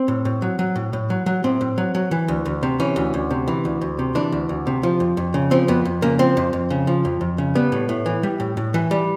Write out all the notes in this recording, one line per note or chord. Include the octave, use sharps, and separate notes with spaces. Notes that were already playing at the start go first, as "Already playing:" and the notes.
Already playing: C4
A2
A2
F#3
F#3
A2
A2
F#3
F#3
A2 C4
A2
F#3
F#3
E3
D2
D2
C3
E3 C#4
D2
D2
C3
E3
D2
D2
C3
E3 D4
D2
D2
C3
F3
F2
F2
C#3
F3 C4
F2 B3
F2
C#3 A#3
F3 C4
F2
F2
C#3
F3
F2
F2
C#3
G3 B3
A2
A2
E3
G3
A2
A2
E3
G3